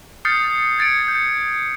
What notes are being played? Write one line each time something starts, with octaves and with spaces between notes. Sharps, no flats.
D#6 F6 G6 A6 C7 C#7
G#6 A6 C#7 D7
G6